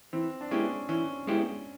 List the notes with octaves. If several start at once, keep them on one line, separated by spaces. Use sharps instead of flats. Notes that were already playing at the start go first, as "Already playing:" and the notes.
E3 C4
D4
G#3 B3 C#4 E4 G4
E3 C#4
G#3 B3 E4 G4